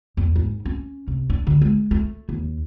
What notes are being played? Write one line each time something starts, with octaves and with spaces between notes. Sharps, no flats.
E2
G#2
C#4
C3
D4
D3
G#3
A3
D#2